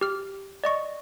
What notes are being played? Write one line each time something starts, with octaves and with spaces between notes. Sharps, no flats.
G4 F6
D5 D#5 C#6